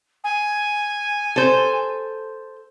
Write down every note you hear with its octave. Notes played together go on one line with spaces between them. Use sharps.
G#5
A4 C5